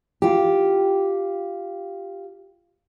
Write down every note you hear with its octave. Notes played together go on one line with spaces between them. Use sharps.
F4 G4